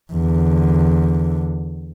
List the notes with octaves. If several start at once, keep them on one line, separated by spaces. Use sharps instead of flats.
E2 D3